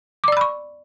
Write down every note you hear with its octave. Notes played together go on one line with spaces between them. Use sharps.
D5 B5 C#6 D6 E6